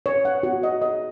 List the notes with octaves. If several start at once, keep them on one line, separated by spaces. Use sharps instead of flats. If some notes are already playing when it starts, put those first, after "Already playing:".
C#5
F#5
F#4
D#5
D#5